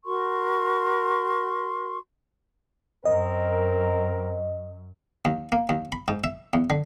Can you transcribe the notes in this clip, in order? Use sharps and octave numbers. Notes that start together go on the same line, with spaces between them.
F#4 A#4 C6 C#6
F#2 C4 A#4 D#5
D#2
A#3
D#2
B5
G#2
E5
E2
D3